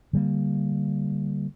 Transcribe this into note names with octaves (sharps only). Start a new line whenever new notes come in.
D3 G3 A#3